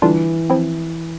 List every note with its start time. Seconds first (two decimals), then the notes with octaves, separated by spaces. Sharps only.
0.02 D3 E3 G3 D4 F4
0.50 F3 C4 E4